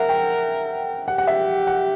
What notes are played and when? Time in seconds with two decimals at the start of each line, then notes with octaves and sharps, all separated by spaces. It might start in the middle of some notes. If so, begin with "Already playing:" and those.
Already playing: A#4 E5 F#5
0.09 G5
1.08 G4 F#5
1.18 F#5
1.27 E5
1.67 F#5